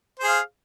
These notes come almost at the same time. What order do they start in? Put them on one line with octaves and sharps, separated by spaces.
C5 G#4 F5